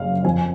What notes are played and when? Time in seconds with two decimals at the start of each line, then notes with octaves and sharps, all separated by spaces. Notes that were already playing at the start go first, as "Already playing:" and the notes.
Already playing: F#1 F#2 C#3 F5
0.24 F2 F3 G#5